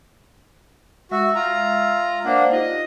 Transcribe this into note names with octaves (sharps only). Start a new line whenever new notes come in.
G#3 F#4 E5 E6
F4 A#5
A#3 D4 C5 D5 F#5
D#4 F4 G4 D#5